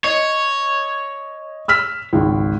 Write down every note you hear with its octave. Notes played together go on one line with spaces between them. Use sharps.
C#5 D#5
E6 F6 B6
G#1 C#2